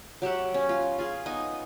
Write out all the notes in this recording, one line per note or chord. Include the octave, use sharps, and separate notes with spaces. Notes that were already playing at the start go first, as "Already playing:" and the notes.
F#3 G4 E5 F#5
C#4
F4
F4 G#4
B3 D#4 D#5 G#5